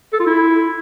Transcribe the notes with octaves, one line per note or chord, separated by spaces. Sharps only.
A4
F4
E4